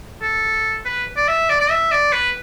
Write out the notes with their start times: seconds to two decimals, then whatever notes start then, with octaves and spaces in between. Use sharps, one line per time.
0.22 A4
0.85 B4
1.17 D5
1.28 E5
1.50 D5
1.60 D5
1.71 E5
1.92 D5
2.13 B4